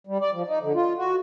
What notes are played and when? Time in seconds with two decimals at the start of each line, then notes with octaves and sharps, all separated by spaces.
0.07 G3
0.21 D5
0.33 F3
0.47 D#4
0.62 D3
0.75 F4
0.97 F#4